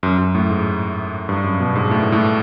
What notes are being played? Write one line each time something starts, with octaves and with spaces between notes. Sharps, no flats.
F#2
F#2
A2
G#2
G2
F#2
B2
G#2
A2
A2